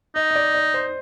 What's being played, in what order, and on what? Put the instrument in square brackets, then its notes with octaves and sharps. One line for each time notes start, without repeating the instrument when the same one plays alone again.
[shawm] D#4 [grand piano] D#5
[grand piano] D#5
D5
D5
C5